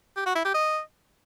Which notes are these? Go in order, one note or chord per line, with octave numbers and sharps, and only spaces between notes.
G4
F#4
E4
G4
D#5